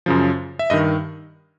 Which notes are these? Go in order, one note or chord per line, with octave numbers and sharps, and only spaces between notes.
F#2 C#3 F3
E5
G2 D#3 D#5